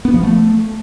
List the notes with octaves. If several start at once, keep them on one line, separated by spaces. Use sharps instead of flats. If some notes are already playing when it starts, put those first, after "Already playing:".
B3
F3
A3